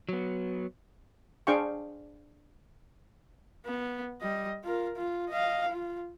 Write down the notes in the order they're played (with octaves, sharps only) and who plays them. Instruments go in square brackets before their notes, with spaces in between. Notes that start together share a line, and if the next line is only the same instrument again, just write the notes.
[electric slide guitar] F#3 B3
[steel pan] D4 G#4 C5 F5 G5 C#6
[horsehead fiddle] B3
G3 D#5
F4 A#4
F4
D#5 F5
F4